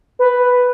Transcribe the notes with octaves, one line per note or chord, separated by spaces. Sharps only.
B4